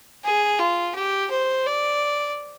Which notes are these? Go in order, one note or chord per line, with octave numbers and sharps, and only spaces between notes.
G#4
F4
G4
C5
D5